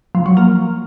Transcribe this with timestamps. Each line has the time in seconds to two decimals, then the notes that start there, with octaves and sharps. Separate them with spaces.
0.15 F3
0.26 F#3
0.37 A#3